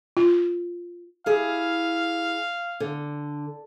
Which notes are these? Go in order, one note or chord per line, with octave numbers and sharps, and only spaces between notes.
F4
E4 G4 G#4 F5
D3